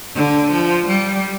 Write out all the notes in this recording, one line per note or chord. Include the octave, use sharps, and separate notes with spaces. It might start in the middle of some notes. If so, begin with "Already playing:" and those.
D3
F3
G3